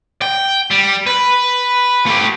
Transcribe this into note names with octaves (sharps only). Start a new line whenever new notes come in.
G5
G3
B4
A3 G4